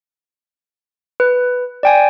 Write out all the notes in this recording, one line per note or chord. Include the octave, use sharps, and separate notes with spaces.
B4
D5 G5 G#5